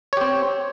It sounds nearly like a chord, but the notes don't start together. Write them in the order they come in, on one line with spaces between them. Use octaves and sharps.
C#5 G4 C4